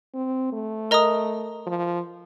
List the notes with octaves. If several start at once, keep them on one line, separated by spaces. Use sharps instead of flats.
C4
A3
A#4 D#5 A#5 D#6
F3